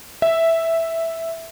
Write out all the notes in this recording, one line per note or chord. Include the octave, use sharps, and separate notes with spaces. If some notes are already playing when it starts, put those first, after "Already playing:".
E5